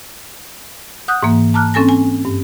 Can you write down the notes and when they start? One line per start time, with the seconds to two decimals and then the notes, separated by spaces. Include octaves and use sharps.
1.08 F#5 D#6 F#6 G6
1.23 G#2 E3 A#3
1.54 A5 A#5 D6 F6 F#6
1.74 C4 C#4 A4 G#5 A#6
1.89 G#5
2.25 G2